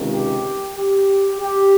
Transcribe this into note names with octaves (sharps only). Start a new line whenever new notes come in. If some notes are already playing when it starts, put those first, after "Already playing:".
Already playing: C#2 C3 D#3
G4
G4
G4